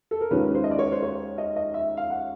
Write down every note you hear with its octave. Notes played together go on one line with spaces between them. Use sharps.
A4
A#4
D#2 D#3 G#3 C#4 F4 B4
C5
D#5
D5
C#5
C5
C#5
D#5
D#5
E5
F5
F#5